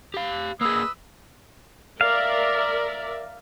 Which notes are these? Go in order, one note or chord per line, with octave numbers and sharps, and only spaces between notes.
G4 F5
A#3 G#4 B4 D#5 E6
A#4 D5 E5 F5